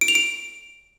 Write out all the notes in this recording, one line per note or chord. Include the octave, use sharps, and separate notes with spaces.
D7
F7
D7